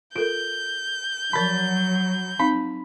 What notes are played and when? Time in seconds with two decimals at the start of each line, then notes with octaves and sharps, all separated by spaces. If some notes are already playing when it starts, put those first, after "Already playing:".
0.16 F4 A4 A#4 G6 D7
1.33 F3 F#3 A#4 A5 B5 A6
2.39 C4 D#4 F5 B5